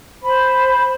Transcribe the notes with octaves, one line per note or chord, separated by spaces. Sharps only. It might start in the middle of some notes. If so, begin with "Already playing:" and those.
C5 B5